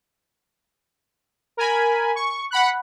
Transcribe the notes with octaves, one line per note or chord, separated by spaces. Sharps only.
A#4 G#5 B5
C#6
F#5 B5 F#6